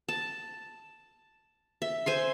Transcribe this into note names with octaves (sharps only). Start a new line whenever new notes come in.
A5
E5
C5 G#5 C6